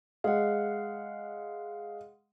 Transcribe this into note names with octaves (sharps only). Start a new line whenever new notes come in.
G#3 F5 F#5